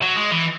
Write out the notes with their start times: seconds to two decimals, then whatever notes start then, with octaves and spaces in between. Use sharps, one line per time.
0.03 F#3
0.17 G#3
0.32 E3